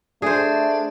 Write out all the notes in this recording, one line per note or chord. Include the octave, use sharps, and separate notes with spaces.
A3 D4 G#4 C5